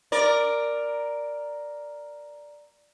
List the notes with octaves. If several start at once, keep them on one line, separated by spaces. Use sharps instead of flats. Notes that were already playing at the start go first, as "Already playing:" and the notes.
A#4 D5